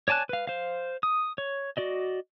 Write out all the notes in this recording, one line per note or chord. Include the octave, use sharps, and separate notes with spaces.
C#5 D5 G#5 A5 F#6
B4 F5
C5 F5
D#6
C#5
F#4 D5 D#5